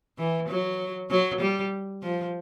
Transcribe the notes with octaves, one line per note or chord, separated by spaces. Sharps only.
E3
F#3
F#3
G3
F3